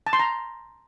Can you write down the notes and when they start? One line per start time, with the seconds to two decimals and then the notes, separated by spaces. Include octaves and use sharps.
0.07 A5
0.13 C6
0.19 A#5